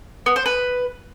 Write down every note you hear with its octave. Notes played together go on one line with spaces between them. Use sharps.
B3
C5
B4